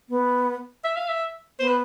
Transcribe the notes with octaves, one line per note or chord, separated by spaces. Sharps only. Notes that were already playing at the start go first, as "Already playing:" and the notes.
B3
E5
F5
E5
B3 C5
B4